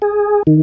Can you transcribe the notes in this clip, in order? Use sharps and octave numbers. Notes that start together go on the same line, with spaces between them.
G#4
D#3